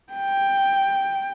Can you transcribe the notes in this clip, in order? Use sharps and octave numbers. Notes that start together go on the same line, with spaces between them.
G5